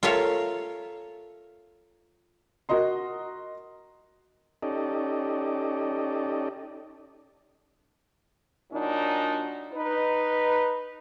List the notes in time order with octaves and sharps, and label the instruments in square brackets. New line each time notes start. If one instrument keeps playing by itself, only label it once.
[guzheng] F4 A4 A#4 C#5 E5 F5
[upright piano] F#4 A#4 D#5 C6
[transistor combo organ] C#4 D#4 G4 A4 D5 D#5
[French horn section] A#2 F#3 D4 D#4
D#4 B4